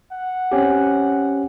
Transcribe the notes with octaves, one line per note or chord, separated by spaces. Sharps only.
F#5
C4 C#4 G4